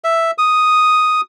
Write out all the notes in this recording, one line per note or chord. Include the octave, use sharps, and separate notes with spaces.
E5
D#6